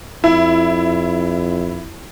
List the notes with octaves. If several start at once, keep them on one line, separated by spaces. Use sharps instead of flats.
F2 E4